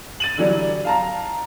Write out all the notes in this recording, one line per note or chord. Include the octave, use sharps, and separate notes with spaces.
A6 D#7 F#7
D3 E3 F#3 G3 D4
F5 A5 A#5